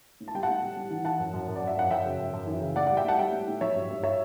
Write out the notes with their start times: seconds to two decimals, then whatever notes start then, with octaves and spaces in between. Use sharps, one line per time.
0.20 A2
0.28 A5
0.35 G3 G5
0.43 F#5 A5
0.49 A2
0.63 G3
0.77 G3
0.91 E3
1.05 E3 F#5 A5
1.19 F#2
1.34 F#2
1.48 F#2
1.56 D5
1.62 F#2
1.67 E5
1.77 F#2 F#5
1.91 F#2 E5 G5
2.04 C#3
2.19 F#2
2.34 F#2
2.47 E3
2.61 C#3
2.76 A2 D5 F#5
2.87 G3 D5 F#5
2.97 E5 G5
3.05 A2 F#5 A5
3.19 G3 E5 G5
3.32 A2
3.48 A2
3.61 F#3 C#5 E5
3.76 G2
3.90 G2
4.03 C#5 E5